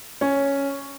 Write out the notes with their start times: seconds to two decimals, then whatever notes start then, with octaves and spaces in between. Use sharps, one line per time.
0.21 C#4